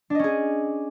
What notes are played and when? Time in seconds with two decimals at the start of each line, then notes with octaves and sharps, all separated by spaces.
0.10 D4
0.15 D#5
0.19 C#4
0.24 G#4